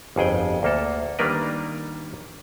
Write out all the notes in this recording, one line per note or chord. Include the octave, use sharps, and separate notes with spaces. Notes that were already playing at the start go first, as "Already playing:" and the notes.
G1 F2 G#4 G5
D2 A#3 A4
D#3 G3 A#3 D4 A#4 B4